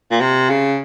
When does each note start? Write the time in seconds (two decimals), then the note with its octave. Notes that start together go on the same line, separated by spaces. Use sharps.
0.11 A#2
0.21 C3
0.49 C#3